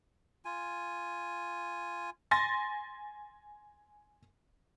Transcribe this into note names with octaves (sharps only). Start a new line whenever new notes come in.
F4 G#5
G#5 C6 A6 A#6